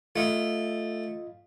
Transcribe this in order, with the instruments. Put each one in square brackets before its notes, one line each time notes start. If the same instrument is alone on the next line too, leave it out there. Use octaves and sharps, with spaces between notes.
[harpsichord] A3 [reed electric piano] F4 D#5 F5